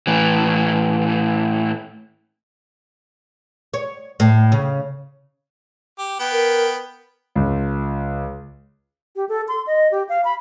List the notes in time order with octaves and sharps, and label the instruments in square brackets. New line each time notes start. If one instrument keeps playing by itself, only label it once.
[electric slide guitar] A2 E3
[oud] C#5
A2
C#3
[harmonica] G4
B3 G5
[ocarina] A#4
[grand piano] C#2
[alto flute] G4
A4
C6
D#5
G4
F5
B5